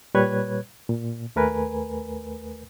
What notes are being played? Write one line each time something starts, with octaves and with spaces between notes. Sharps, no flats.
A#2 G3 B4 C#5 F#6 G#6
A#2
D#2 A3 A#4 B4 G#5